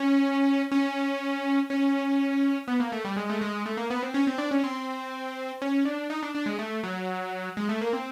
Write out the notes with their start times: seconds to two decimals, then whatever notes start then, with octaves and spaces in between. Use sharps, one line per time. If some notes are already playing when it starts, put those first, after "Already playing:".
Already playing: C#4
0.72 C#4
1.70 C#4
2.68 B3
2.80 A#3
2.92 A3
3.05 G3
3.16 G#3
3.30 A3
3.41 G#3
3.66 A3
3.77 A#3
3.90 B3
4.03 C4
4.14 C#4
4.27 C4
4.38 D4
4.51 C#4
4.64 C4
5.62 C#4
5.85 D4
6.10 D#4
6.23 D4
6.35 D4
6.46 G#3
6.59 A3
6.83 F#3
7.57 G#3
7.69 A3
7.81 A#3
7.93 C4